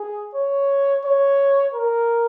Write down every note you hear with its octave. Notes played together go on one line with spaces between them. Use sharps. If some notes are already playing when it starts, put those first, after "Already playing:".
Already playing: G#4
C#5
C#5
A#4